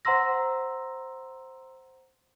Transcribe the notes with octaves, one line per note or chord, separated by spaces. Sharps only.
C5 F#5 A#5 C6 E6 A#6